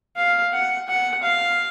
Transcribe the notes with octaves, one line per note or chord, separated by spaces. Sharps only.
F5
F#5
F#5
F5